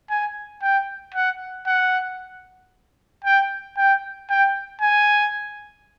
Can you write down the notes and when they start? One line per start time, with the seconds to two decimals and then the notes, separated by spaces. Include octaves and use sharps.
0.10 G#5
0.62 G5
1.14 F#5
1.67 F#5
3.24 G5
3.77 G5
4.30 G5
4.81 G#5